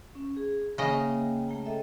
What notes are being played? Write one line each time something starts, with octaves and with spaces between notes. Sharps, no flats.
C#4
G#4
C#3 A#3 D#5 E5 G5
A3 G5 A#5
A4 D#5 E5